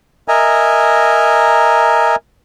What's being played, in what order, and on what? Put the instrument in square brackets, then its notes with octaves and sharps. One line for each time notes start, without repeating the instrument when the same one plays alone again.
[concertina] A#4 D#5 E5 G#5 A#5